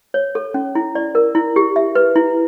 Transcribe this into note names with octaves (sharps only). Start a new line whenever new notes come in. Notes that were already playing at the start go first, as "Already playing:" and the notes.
C#5
A4
C#4
E4
D5
A#4
E4
G4
E5
B4
E4